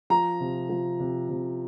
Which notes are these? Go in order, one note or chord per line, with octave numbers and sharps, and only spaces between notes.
F3 A#5
C3
F3
C3
C3